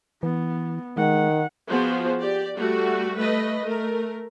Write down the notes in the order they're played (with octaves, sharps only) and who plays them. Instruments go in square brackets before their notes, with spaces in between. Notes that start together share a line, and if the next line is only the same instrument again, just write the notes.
[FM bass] E3 [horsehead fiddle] B3
[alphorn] D#3 [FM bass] G#3 [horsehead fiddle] F#5
[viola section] F3 B3 F#4 G#4 C5
G4 D5
G3 A3 F#4
A3 B4 D#5
A3 A#4